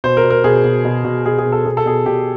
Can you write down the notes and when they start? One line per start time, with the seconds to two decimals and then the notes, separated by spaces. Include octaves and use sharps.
0.04 B2 C5
0.17 A#4
0.24 B2
0.30 A#4
0.44 B2 G#4
0.64 B2
0.85 B2
1.05 B2
1.26 B2 G#4
1.38 G#4
1.46 B2
1.52 A4
1.66 B2 G#4
1.77 A4
1.86 B2 G#4
2.06 B2 G4